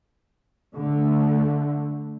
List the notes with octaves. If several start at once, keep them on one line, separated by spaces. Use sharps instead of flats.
D3 A3